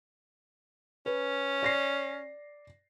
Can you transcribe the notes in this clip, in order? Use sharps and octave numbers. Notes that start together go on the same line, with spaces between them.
C#4 B4
D5 A#6 C7